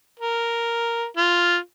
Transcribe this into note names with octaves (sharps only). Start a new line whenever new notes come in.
A#4
F4